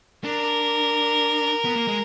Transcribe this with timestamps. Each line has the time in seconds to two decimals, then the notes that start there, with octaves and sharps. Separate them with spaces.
0.24 D4 A#4
1.65 B3
1.76 A#3
1.88 G#3